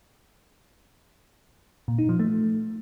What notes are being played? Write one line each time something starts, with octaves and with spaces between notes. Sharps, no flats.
A#2
D#4
F3
A3